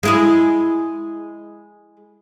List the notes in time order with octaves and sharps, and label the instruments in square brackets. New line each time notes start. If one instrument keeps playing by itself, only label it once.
[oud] G#3 E4 G#4